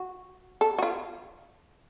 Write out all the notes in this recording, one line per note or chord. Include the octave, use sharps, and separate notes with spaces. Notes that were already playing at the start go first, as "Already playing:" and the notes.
Already playing: F#4
A4
F#4
F4